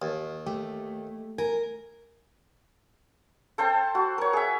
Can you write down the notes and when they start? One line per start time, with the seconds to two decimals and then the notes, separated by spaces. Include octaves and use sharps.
0.02 D#2
0.46 A3 G4
1.38 A#4 G#5
3.58 A4 C5 G5 A5
3.95 F#4
4.18 A#4 C#5
4.33 G#4 E5